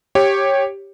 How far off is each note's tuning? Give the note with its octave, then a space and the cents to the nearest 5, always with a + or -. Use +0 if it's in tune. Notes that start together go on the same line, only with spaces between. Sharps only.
G4 +0 C#5 -15